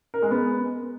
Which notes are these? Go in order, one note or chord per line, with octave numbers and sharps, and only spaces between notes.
A#4
G#3
B3